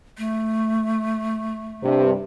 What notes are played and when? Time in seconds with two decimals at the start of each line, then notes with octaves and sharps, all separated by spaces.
0.18 A3
1.83 G2 C3